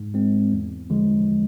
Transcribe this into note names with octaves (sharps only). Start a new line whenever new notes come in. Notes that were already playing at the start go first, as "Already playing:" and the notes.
Already playing: G#2
G#3 C4
E2
D3 F3 G#3